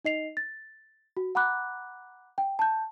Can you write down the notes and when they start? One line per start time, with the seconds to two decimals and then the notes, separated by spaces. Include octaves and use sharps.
0.05 D#4 D#5 C7 F7
0.37 A6
1.17 F#4
1.35 F#5 A#5 B5 D6 F#6
2.38 G5
2.59 A5 G6